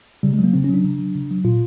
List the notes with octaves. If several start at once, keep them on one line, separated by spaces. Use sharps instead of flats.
C#3 G3
G#3
F#3
A#3
C#3 C4
C#4
F#3 D4
C#3
F#3
C#3
F#3
A#2 F4